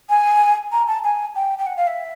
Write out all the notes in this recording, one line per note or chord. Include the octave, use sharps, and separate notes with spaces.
G#5
A#5
A5
G#5
G5
G5
F#5
F5
E5